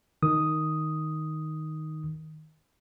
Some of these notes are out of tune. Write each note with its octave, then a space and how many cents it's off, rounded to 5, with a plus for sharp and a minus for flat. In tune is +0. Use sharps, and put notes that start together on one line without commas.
D#3 +0 D#6 +0